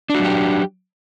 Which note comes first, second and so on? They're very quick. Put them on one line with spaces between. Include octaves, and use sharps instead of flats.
D4 F#4 F#3 G4